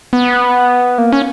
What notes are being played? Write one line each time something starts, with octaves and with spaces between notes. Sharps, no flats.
B3
A#3
C#4